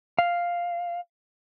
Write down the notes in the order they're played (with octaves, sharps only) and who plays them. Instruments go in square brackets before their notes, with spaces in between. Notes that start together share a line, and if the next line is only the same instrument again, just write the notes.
[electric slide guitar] F5